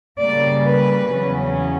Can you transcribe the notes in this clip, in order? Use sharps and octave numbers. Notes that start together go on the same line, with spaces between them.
C#3 G3 A#3 D5
B4
E2 C#3 F#3 C#4